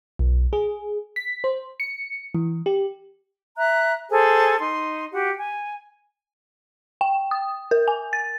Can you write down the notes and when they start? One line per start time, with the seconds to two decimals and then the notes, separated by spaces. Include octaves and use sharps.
0.19 B1
0.53 G#4
1.16 B6
1.44 C5
1.80 C#7
2.35 E3
2.66 G4
3.56 E5 A#5 F#6
4.10 G#4 A4 C5 G#5
4.60 D#4 C6
5.12 F#4 G4 F#5
5.38 G#5
7.01 G5
7.31 D#6
7.71 A#4
7.88 G#5
8.13 A6